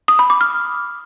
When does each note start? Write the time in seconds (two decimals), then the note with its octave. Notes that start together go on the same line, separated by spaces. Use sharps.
0.08 D#6
0.19 B5
0.30 D6
0.41 F6